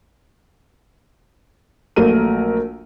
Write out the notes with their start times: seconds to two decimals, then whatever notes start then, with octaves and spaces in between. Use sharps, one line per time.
1.96 A#1 F#3 A3 A#4 D#7